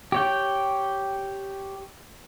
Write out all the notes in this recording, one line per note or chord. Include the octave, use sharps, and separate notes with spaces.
G4 C#5 G5